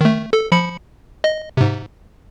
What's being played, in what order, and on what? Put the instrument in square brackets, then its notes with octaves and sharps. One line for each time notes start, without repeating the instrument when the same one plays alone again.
[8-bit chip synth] D#3 A3
A4
F3 B5 C#7
D#5
G#2 C3